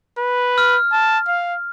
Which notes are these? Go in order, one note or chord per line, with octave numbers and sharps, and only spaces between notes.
B4
F6
A5
F5